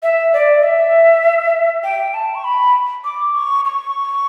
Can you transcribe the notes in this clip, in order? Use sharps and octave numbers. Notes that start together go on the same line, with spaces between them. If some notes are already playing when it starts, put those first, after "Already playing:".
E5
D5
E5
G5
A5
C#6
B5
D6
C#6
C#6